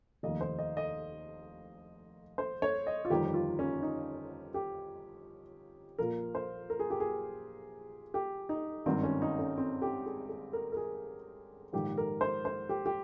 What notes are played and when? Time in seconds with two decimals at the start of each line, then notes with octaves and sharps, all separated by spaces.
0.23 F1 D#2 D#3 D#5
0.41 C5
0.59 D#5
0.77 D#5
2.38 C5
2.62 C#5
2.87 D#5
3.05 F4
3.10 G1 F2 D#3 G4
3.34 F4
3.59 C#4
3.82 D#4
4.54 G4
5.98 A#1 A#2 A#4
6.35 C5
6.70 A#4
6.80 G#4
6.90 G4
7.00 G#4
8.14 G4
8.49 D#4
8.86 G#1 G2 D#3 C4
9.03 C#4
9.22 D#4
9.39 C#4
9.58 C4
9.82 G4
10.06 G#4
10.29 G#4
10.53 A#4
10.72 A#4
10.77 G#4
11.73 A#1 G#2 D#3 G4
11.98 A#4
12.21 C5
12.45 C5
12.69 G4
12.86 G4